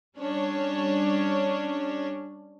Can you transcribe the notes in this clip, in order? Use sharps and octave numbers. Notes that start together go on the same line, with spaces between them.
G3 C#4 D4 C#5